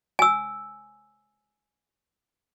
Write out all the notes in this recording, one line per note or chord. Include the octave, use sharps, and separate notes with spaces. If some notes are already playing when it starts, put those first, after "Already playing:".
G#5 E6